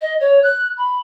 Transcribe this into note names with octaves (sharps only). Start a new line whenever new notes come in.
D#5
C#5
F#6
B5